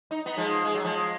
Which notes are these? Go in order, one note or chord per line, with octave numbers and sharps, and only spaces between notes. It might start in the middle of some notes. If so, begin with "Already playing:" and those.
D#4
B3 D#4
F3 G#3
G#3
F#3
F3 G#3